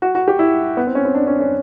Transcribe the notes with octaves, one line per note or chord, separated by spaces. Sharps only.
F#4
F#4
G4
E4
B3
C4
C#4
C4
D4
C#4
C#4